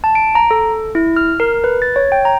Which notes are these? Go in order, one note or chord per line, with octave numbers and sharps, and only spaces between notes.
A5
D7
A#5
A4
E4
F6
A#4
B4
A6
C#5
G5
A#5